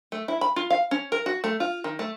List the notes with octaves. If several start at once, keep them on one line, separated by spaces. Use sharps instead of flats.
A3
E4
B5
F4
F5
C#4
A#4
F#4
A3
F4
D#3
A3